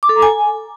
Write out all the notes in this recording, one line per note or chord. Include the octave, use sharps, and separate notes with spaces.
D6
A4
A#5
G#5